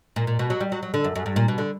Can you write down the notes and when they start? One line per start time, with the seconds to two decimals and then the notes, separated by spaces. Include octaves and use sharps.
0.16 A#2
0.27 A#2
0.39 B2
0.50 F#3
0.60 G3
0.72 F#3
0.83 F#3
0.94 D3
1.04 F#2
1.16 F#2
1.26 G2
1.36 A#2
1.48 B2
1.58 D3